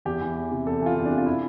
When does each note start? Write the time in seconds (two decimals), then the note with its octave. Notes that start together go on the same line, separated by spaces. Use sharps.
0.05 E2 G4
0.21 E3
0.36 E2
0.51 C3
0.66 E2 A4
0.81 E3 F4
0.97 E2
1.06 D4
1.12 C3
1.18 F4
1.26 E4